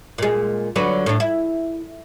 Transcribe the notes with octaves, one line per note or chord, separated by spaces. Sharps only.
A#2 G#3
D3 F#3 B4
A2 D4
E4